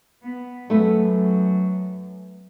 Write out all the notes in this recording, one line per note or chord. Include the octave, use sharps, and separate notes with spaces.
B3
F#2 A3 B3